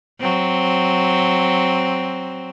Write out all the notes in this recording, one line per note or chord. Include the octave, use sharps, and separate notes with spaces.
F#3 C4